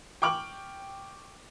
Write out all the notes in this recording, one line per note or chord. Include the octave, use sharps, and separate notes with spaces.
G5 C#6 D6 F6 F#7